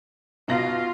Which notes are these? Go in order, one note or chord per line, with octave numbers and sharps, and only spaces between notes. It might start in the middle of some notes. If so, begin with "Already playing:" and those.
B2 F4 A#6